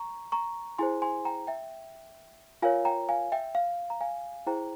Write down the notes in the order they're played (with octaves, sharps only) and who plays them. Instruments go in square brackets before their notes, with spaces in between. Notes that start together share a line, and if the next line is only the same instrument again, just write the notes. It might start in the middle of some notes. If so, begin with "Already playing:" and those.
Already playing: [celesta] A#5 C#6
A#5 C#6
E4 G#4 C5 G#5 C6
G#5 C6
G5 A#5
E5 G5
F4 A#4 C#5 F5 G#5
G5 A#5
F5 G#5
E5 G5
F5
A#5
F5 G#5
E4 G#4 C5 G5 A#5